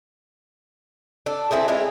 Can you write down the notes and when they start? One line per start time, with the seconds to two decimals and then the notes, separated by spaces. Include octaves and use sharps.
1.26 D4 A4
1.51 C4 E4 G#4 A4
1.68 G#3 C4 E4 F4